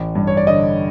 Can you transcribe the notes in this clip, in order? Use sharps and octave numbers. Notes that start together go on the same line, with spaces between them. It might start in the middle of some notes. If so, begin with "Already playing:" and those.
Already playing: A1
G2
C#5
D5
D3 D#5